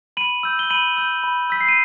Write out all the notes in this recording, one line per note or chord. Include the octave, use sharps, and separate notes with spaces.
B5 D#7 F#7
E6 G6
G7
B5 D#7 F#7
E6 G6
B5
E6 G6 B6
C7
D#7